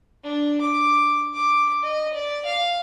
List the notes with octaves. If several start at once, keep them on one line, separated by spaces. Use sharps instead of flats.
D4
D6
D6
D#5
D5
F5